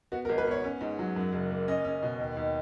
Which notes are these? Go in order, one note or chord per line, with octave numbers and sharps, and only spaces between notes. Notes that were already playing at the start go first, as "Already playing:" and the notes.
B3 F#4
A#4
G#1
B4
B3 C#5
C#4
G#2
F#3
F#2
F#1
A#3
C#4 D#5
C#4
B2
D#2
D#2